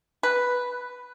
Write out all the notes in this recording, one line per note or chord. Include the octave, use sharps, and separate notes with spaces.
B4